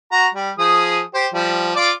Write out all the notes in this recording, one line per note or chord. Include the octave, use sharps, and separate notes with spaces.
F#4 A#5
G3
F3 G#4 D#6
G4 C5
F3 G3
F4 D5 D6